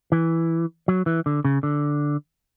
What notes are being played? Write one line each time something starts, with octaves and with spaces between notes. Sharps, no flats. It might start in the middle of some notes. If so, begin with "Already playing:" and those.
E3
F#3
E3
D3
C#3
D3